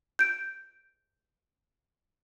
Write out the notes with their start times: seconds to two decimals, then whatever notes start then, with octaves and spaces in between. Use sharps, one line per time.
0.19 G6 D7